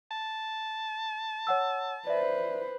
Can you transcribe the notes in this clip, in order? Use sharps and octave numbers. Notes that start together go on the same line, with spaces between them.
A5
C#5 F#5 E6
B4 C5 D5 E5